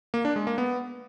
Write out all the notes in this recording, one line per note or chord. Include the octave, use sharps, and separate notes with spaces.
A#3
D4
G#3
A#3
B3